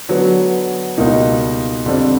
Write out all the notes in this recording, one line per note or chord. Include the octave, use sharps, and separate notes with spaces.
D3 F#3 B3
C#2 B2 G3 A#3 D#4
F2 D3 G3 C4